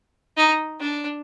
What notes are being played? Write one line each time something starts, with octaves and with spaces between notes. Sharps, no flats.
D#4
D4